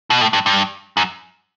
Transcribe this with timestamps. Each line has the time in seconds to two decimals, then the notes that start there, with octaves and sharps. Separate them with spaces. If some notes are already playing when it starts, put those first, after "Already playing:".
0.10 B2
0.21 A2
0.33 G2
0.46 G2
0.97 F#2